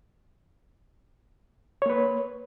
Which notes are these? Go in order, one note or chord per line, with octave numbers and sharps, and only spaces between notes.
A#3 B4 C#5